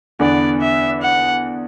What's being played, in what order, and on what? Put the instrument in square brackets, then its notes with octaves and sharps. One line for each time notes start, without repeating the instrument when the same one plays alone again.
[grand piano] E2 D3 B3 D4 [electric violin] D5
[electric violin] E5
F#5